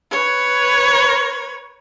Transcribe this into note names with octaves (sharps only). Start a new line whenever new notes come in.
B4 C#5